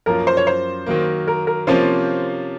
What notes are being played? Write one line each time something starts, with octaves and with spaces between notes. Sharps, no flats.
F#2 F3 A#3 C#4 F4 A#4
C5
C#5
C5
D#3 F#3 A#3
A#4
A#4
C3 F3 A#3 C#4 F4 C5